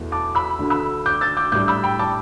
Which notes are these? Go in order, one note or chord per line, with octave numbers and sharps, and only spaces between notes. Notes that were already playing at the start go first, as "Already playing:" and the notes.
Already playing: E2 B2 A3 E4
A5 D6
B5 E6
D2 D3 A3
B5 E6
D6 G6
E6 A6
D6 G6
A2 G3 D4 D6 G6
B5 E6
G5 B5
A5 D6